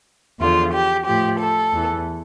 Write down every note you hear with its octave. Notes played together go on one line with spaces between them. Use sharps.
E2 D3 F3 F4
G4
A2 F3 G4
A4
E2 E3